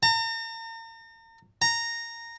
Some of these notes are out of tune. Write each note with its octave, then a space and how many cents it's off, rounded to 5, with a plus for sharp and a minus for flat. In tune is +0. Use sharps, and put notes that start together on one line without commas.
A#5 -40
A#5 -10